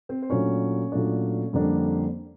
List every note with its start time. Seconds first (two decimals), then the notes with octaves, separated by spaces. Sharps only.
0.09 C4 C5
0.22 C5
0.30 A#2 F#3 A3 C#4 D4 C#5
0.92 A#2 F#3 A3 D4
1.53 F2 D3 G3 A#3 D4